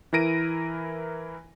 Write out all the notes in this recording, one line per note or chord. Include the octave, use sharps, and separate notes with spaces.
E3 E4 A#4 A#6 D7 D#7